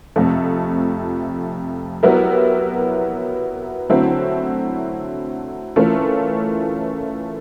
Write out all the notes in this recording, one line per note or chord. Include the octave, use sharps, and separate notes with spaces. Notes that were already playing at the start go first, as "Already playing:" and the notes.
F2 C3 F3 A3
F#3 B3 E4 G4 A#4
D3 F#3 A3 C4 E4
E3 A3 C#4 F4 A#4